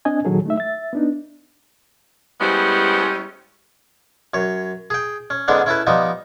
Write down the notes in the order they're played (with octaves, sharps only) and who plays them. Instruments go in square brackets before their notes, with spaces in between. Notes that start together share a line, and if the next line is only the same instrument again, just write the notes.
[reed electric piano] C4 D4 D#5 G#5
A#2 D#3 F#3 G#4 A4
A3 D#4 E5
E5 A6
B3 D4 D#4
[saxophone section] G3 G#3 B3 C#4 E4 C5
[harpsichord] F#2 C#5
G#4 G5
C#4
G#2 D3 G#3 B3 C#4 D4
C#4 E4 A4 B4
F3 G3 B3 D#4